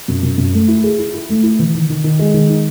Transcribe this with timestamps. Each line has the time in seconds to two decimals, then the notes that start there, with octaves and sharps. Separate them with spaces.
0.08 F#2
0.23 F#2
0.38 F#2
0.54 A3
0.68 E4
0.84 G#4
0.99 E4
1.14 E4
1.29 A3
1.43 E4
1.59 E3
1.75 D#3
1.90 D#3
2.04 D#3
2.19 G#3
2.34 D#3
2.49 D#4